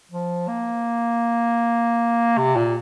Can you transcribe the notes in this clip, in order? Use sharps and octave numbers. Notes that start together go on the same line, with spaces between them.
F3
A#3
C3
A#2